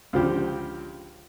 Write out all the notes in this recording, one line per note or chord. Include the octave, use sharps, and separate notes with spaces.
C#2 D3 F3 G4